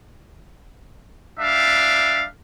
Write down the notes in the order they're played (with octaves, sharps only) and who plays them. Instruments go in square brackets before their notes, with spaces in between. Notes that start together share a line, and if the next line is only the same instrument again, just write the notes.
[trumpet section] G3 D4 E5 F5